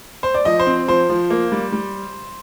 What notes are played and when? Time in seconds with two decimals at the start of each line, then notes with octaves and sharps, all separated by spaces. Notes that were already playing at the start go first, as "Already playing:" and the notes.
0.23 C5
0.34 D5
0.45 F3 D#5
0.60 C5
0.66 C4
0.88 F3 C5
1.09 F3
1.30 A#3
1.52 G3
1.72 G3